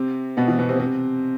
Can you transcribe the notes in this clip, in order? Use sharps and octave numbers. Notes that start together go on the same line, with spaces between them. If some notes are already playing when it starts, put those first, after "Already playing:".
Already playing: C3 C4
B2 B3
E3
B2 B3
C3 C4
C3 C4